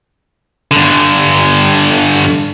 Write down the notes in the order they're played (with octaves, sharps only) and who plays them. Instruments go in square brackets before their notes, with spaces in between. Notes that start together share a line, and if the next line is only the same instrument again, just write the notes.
[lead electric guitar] G2 D3